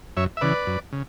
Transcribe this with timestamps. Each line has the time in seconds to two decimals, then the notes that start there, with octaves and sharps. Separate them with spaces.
0.17 F#2 C#5 E5
0.37 E5
0.41 C#3 E3 B4 D5
0.67 F#2
0.93 C#3